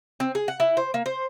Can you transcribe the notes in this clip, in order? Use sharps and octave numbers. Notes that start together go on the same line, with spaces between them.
C4
G#4
F#5
E4
C5
A#3
C5